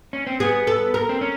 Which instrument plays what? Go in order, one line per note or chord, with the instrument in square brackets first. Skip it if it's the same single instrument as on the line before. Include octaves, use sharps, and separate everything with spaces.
[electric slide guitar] C#4
C4
[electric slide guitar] B3 [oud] G#4
[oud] A4
A#4
[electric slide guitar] C4
C#4